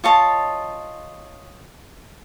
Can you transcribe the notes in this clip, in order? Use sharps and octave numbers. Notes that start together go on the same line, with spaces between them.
F4 C#5 D#5 A5